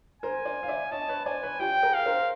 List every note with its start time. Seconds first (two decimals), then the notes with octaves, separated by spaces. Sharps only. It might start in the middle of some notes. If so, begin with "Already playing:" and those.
0.22 A#4 C5 G#5
0.45 C5 D5
0.63 F5
0.68 D5 E5
0.91 C#5 D#5 A5
1.08 B4 C#5
1.25 C5 D5 G#5
1.43 B4 C#5
1.59 F4 G4 G5
1.83 G#4 A#4
1.94 F5
2.06 A#4 C5